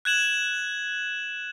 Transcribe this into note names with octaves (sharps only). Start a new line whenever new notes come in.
F#6 G#6 E7 F#7